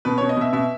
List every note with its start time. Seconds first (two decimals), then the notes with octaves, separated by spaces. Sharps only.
0.05 B2 B4
0.18 B2 C#5
0.29 D#5
0.37 B2 E5
0.53 B2 E5